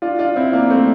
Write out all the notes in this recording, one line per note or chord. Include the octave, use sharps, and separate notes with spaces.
D4 F4
D4 F4
C4 E4
A#3 D4
A3 C4